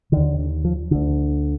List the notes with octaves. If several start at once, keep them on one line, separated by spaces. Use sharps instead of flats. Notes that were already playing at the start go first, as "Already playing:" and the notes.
D#2 D3 D#3
D3
F3
D2 D3